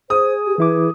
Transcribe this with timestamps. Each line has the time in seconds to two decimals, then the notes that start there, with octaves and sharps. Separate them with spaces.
0.10 G#4 C5 D#6
0.46 G4
0.58 E3 E4 B4 D6